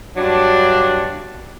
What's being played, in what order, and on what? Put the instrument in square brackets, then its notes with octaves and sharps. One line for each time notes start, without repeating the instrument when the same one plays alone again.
[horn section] G2 F#3 D4